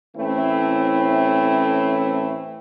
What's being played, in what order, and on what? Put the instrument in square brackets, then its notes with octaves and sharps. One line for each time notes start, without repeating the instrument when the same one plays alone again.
[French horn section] A2 E3 A3 C4 C#4 E4